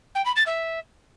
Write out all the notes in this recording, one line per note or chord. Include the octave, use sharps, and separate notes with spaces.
G5
B5
A6
E5